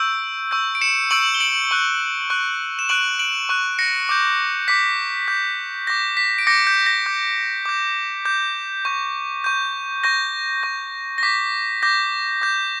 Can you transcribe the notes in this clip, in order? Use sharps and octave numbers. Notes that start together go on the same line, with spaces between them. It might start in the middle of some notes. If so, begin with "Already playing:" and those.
Already playing: C#6 E6 G6 D7
C#6 E6 G6
D7
C#7 E7
C#6 E6 G6 D7 F#7
G7
D7 F#7
C#6 F#6
C#6 F#6
E7
C#6 F#6 D7 F#7
D7 F#7
C#6 F#6
A#6 C#7
D6 G6
D6 G6 B6
D6 G6
D6 G6 A#6
B6
D7
D6 G6 A#6 C#7
G6
A#6
D6 G6
D6 G6
D6 G6
C#6 G6
C#6 G6
C#6 G6 A#6
C#6 G6
A#6
D6 G6 B6
D6 G6 A#6
D6 G6